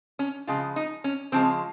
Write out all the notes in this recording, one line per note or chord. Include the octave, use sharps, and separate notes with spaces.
C#4
C#3 F3 G#3 F4
D#4
C#4
C#3 F3 G#3 C4